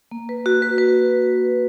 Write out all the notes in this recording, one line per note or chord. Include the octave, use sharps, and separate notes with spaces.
A#3
B4
F#4
B4
B4